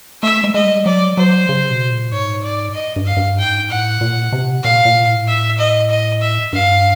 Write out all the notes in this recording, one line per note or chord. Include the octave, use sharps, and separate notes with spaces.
A3 E5
G#3
G#3 D#5
G3
F#3 D5
F#3 C5
C#3
B2
A#2
G#2 C#5
D5
D#5
G2
F5
G2
G#2 G5
A2 F#5
A#2
C3
A#2 F5
A#2
A2
E5
D#5
D#5
E5
G2 F5